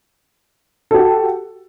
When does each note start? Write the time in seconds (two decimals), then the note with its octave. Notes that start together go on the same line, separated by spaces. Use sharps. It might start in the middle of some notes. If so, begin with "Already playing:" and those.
0.91 A4
0.94 G4
0.98 F#4